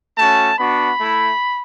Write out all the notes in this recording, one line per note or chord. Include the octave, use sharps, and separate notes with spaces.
A3 C#4 F#4 A5
B3 D4 F#4 B5
A3 E4